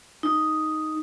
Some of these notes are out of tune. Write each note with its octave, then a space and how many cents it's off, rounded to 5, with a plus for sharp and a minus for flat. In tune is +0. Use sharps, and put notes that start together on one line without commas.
D#4 +0